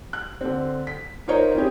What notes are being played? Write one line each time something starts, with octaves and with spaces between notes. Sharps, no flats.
F#6
D3 C4
B6
D#4 F4 A#4 C5 C#5 D#5
C4 C#4 E4 G4 G#4